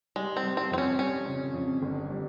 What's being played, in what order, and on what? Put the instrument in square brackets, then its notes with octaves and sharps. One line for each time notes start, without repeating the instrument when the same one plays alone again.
[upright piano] G3 [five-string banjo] G#3
[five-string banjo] C4
[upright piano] G3
[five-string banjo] C4
[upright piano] F2 [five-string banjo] C4
[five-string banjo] C#4
[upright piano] G3 [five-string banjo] C#4
[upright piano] C#3
F2
G1
G3